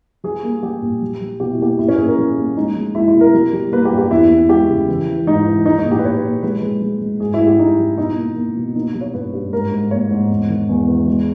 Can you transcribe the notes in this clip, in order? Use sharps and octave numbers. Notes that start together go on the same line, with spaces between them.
G3 G#4
A#3
G3 G4
A#2
G3
G3
B2 G4
E4
A#3 G4
A#2 E4
C#4
A#2 G#4
A#4
G3 G#4
A#3
G#3 D#4
G#3
G#3 E4
E4
B2
A#4
G3
G3
A#3 B4
G4
G2
G4
E2 E4
E2
G#3 G4
C#3
E3
E3
G#2 D#4
E3
G#3 D#4
D#4
A#2
G4
B4
A#2 C#5
A#2
G#3 B4
G#3
G#3
G#3
G#2 G#4
E4
G#2
G4
G#2 D#4
G3
B2 D#4
A#3
A#3
B2
A#3 D#4
G3
C#5
G2 B4
G2
G#2 A#4
G#2
A#3 C#5
G#2
E2
D#3
E2
E2
G#3